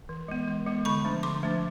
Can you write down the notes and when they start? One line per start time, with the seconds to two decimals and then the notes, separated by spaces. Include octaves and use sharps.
0.09 E3
0.28 G#3 B3
0.48 E3
0.66 G#3 B3
0.85 D3 B5 C#6
1.04 F3 A3 D4
1.23 D3 C6 D6
1.43 F3 A3 D4